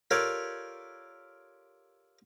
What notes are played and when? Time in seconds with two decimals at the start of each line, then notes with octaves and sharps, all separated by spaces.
0.11 F4 G4 A4 A#4 C#5 D5